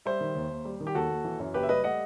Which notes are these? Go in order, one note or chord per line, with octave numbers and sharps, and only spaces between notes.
G3 C5 E5
D#3
D#2
D#2
G3
D#3
G4
D#2 F#4 A4
D#2
E3
F#2
F#1 G4 B4
E5
G3 B4 D#5
A3 D#5 F#5